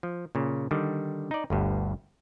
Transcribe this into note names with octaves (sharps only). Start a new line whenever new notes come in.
F3
A#2 C#3
D3 D#3 G3
D#4 D5
G1 D2 G2